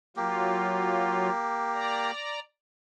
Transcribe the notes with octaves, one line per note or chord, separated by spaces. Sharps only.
F#3 A#3 F4 G4
D5 A#5